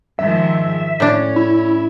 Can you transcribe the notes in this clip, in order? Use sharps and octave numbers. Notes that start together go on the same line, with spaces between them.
G#2 D#3 F3 E5
A2 C#4 D4
E4